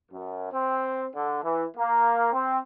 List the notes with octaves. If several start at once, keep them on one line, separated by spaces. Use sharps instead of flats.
F#2
C4
D3
E3
A#3
C4